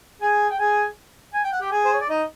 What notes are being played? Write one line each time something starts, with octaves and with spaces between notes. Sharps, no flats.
G#4 G#5
G5
G#4 G#5
G#5
G5
F#5
G4 G5
G#4 G#5
C5
C#5
D5
D#4 D#5